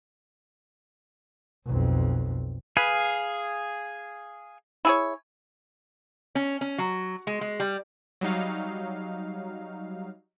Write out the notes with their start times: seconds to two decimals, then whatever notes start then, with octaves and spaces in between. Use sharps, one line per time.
1.66 B1 F2
2.77 G#4 B4 F5 G#5
4.85 E4 G#4 C#5
6.35 C#4
6.61 C#4
6.78 F#3
7.27 G#3
7.41 G#3
7.60 G3
8.21 F#3 G3 D#4 F5